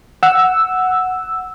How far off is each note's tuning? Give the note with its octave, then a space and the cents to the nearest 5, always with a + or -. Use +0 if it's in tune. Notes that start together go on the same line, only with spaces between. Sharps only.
F#5 +0 E6 +0